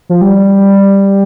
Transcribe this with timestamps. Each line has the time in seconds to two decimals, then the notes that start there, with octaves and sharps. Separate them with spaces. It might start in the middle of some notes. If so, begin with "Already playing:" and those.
0.09 F3
0.21 G3